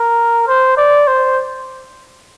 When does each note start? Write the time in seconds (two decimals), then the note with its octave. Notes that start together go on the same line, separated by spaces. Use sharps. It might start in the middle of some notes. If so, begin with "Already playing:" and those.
Already playing: A#4
0.48 C5
0.77 D5
1.07 C5